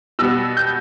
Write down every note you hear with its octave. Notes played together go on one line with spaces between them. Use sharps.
B2 G3 B3 E6
G6